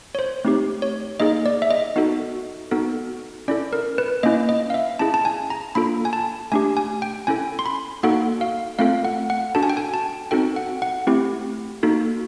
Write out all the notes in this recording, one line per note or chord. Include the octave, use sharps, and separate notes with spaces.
C#5
C5
A3 C4 D#4 G4
C#5
A#3 D#4 G#4 D#5
D5
E5
D#5
B3 D#4 F#4 A4
B3 D#4 F#4 A4
C#4 E4 A4 D5
A#4
B4
A#3 C#4 E4 D#5
D#5
F5
E5
C#4 E4 G#4 A5
A5
G#5
A#5
A#3 D4 F4 A4 B5
G#5
A5
A3 D4 G4 G#5
G#5
G5
C#4 E4 A4 G#5
C6
B5
A#3 D#4 F#4 A4 F#5
F5
A3 C4 F4 A4 F5
F#5
F#5
D4 F#4 A4 A5
G#5
G5
G#5
A5
C4 D#4 F#4 A4 G5
F#5
F#5
A3 C4 E4 G4
A#3 D#4 F#4 A4